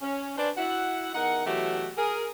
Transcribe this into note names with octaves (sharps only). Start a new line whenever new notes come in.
C#4
C#4 D4 B4 C5 D5
E4 F#4 F#5
E2 D#4 A#4 F#5
B2 E3 F#3 A3 F#4 G4
G#4 A#4